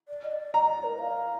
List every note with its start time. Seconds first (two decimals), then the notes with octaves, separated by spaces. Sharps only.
0.08 D5
0.25 D#5
0.31 D5
0.54 D#5 A#5
0.68 D5
0.84 A#4
0.99 F5